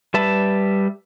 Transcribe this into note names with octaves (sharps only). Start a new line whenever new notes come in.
G3 B4 E5 A5 B5